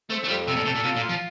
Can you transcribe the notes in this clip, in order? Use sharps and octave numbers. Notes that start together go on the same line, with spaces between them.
A3 C4
A3
F2 G3
C3 A4
A#2
C3 A4
A#2
C3 F4
A#2
F4
F3